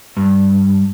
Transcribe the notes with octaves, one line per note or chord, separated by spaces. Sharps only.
G2